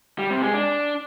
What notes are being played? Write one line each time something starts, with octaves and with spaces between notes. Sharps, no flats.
G3
C3
G#3
D4